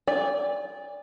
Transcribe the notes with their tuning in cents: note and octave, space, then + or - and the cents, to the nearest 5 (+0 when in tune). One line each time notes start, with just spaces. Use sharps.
D5 -15 G#5 -40